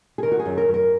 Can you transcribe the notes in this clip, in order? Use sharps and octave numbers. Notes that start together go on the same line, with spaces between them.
G#4
D#3 A#4
F#4
G#4
F#2
A#4
F#2
A#4